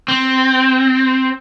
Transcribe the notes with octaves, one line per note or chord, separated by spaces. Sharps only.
C4